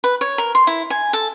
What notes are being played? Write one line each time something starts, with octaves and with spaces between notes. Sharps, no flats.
B4
C#5
A#4
C6
E4
G#5
A4